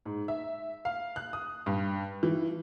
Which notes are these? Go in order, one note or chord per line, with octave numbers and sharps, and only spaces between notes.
G#2
E5
F5
F#6
D#6
G2
E3